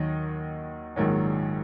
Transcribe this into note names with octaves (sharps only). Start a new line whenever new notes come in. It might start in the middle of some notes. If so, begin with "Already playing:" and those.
Already playing: D#2 D#3 F#3 D#5
A#1 G#2 D#3 F#3